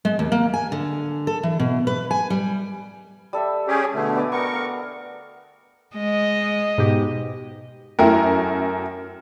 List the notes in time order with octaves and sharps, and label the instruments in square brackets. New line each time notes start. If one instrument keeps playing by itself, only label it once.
[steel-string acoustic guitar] G#3
D#2
A#3
G#5
D3
A4
E3
B2
B4
G#5
G3
[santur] G3 A4 E5
[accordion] C#4 G4 G#4
B2 D3 A3
[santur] B3 D5 D#6
[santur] B3 D6 [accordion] A#4 C#6
[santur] F5
[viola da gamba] G#3 D#5
[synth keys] G#2 B2 G4
[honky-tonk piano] F#2 A3 A#4 [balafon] E4 E5 G5